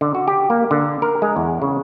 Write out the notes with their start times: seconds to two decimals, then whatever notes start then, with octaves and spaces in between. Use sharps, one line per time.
0.01 D3
0.15 F#4
0.28 G4
0.50 A#3
0.71 D3
1.02 A#4
1.22 G#3
1.37 E2
1.62 C#3